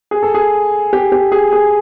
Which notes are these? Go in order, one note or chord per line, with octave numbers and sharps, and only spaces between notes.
G#4
A4
G#4
G4
G4
G#4
G#4